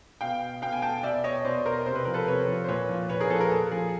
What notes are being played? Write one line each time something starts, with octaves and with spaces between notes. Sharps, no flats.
B2 F5 G5
B2 F5 G5
G#5
G5 A5
B2 D5 E5
C#5 D#5
B2 C5 D5
A#4 C5
C3 C5
B4
F3 A#4
A4 B4
C3 B4 C#5
F3
C5
A#2 B4 C#5
F3
A#2 B4 C#5
G#4 A#4
F3 A4 B4
G#4 A#4
A#2 A4
F3 G#4